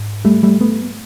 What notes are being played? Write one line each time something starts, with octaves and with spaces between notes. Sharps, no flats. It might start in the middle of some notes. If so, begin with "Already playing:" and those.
Already playing: G#2
G3 A3
G3 A3
A3 B3